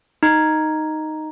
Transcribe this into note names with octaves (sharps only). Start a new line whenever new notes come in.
D#4